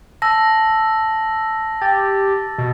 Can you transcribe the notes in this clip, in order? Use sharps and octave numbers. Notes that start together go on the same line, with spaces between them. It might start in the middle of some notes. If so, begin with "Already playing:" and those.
A5 E6 A#6
G4 A6
B2